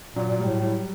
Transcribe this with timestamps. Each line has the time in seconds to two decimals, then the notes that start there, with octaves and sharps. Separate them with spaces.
0.16 A#2 F#3
0.31 A#2
0.39 G3
0.45 A2
0.59 A2 G3